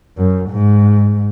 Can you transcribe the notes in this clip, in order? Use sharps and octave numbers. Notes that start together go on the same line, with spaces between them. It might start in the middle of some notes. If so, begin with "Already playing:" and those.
F#2
G#2